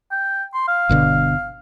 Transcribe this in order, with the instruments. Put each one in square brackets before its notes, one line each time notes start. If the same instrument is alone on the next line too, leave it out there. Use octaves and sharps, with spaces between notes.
[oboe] G5
C6
F5
[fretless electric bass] G1 B2 D3